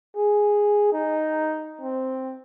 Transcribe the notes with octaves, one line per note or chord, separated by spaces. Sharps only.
G#4
D#4
C4